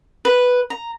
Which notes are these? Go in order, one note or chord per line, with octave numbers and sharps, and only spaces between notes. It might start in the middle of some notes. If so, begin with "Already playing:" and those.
B4
A#5